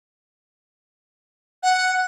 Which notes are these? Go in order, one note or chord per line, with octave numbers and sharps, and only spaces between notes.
F#5